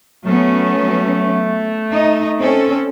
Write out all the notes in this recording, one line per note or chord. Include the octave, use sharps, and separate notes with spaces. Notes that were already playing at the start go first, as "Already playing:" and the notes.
F#3 A3 B3 C#4
D#4
C4 C#4 A4